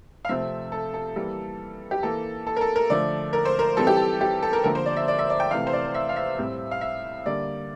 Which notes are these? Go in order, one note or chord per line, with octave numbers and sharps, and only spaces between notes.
F5
C3 F3 A3 C4 E5
A4
A4
E3 G3 A#3
G4
E3 A#3 A4
A4
A#4
A4
A#4
D3 F3 A3 D5
A#4
C5
A#4
E3 G3 C4 A4
G4
A4
G4
A4
A#4
D3 F3 A#3 A#4
C5
D5
E5
D5
E5
D5
G5
C3 E3 A3 F5
C5
D5
E5
F5
E5
A2 G3 C4
F5
E5
D3 G3 A#3 D5